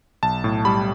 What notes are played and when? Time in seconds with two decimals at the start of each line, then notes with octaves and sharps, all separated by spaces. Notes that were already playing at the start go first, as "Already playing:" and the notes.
0.23 B1 A5
0.44 A2
0.65 G3 B5